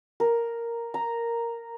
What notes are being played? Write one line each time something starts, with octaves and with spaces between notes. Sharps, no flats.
A#4
A#5